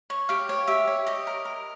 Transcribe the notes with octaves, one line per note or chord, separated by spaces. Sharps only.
C#5
G4 F5
C#5
G4 E5
C#5
G4 D#5
A#4
A#4